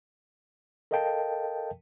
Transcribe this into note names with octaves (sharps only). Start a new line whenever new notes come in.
A4 A#4 D#5 F5 G5 A5